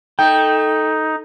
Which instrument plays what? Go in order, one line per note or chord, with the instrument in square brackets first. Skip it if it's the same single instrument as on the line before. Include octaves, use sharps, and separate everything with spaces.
[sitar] A3 [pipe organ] D#4 [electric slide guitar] G5